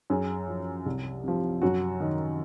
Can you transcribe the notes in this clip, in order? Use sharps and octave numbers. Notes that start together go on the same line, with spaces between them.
F#2 G#4
F3
C2
C3 F3
F#2 F#4
D#3